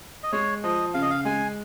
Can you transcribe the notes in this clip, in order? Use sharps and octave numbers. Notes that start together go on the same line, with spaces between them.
D#5
G#3 C#5
F3 D#5
C#3 F5
D#5
F5
G#3 G#5